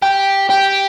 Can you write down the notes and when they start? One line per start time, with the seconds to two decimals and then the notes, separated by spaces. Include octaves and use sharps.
0.02 G4
0.50 G4